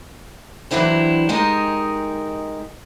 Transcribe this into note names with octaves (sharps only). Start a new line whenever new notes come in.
E3 F#3 D4 E4 G4 C5
G#3 D#4 G4 G#4 A#4 D#5